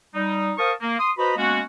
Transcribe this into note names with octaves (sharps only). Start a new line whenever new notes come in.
G3 D#4
A#4 C5 F5 A5 C#6 D#6
A#3
C6 D#6
F#4 B4 C5 D#5 A#5 B5
G#3 A#3 B3 C#4 F#4